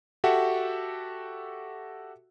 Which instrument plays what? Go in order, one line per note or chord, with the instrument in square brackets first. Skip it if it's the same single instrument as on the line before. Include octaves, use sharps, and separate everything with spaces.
[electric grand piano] F#4 G4 A4 E5 F#5